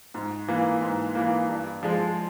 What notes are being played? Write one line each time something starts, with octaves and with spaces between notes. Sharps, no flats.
G#2
E3 A#3
G#2
E3 A#3
G2
F3 G#3